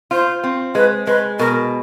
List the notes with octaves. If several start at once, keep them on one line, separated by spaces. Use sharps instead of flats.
F4 C5
C4
G#3 B4
G#3 B4
B2 A#4